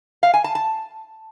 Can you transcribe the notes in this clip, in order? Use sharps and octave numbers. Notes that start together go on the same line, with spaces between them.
F5
G#5
A5
A5